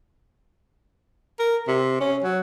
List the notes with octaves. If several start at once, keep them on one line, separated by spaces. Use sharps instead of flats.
A#4
C3
C#4
F#3